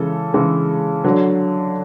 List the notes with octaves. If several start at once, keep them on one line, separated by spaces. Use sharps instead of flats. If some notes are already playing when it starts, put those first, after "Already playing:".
Already playing: C#3 E3 G#3 A4
C#3 E3 G#3
D3 F#3